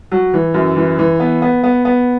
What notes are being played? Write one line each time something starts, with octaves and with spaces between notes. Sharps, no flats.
F#3
E3
F#2
E3
E3
B3
B3
B3
B3